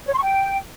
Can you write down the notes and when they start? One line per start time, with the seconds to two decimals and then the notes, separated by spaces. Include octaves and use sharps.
0.07 C#5
0.12 C6
0.17 C#6
0.22 G5